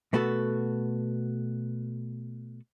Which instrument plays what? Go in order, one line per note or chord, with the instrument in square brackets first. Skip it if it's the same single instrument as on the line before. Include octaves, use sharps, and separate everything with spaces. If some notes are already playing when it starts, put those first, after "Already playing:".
[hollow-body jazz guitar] B2 A3 B3 F#4 A4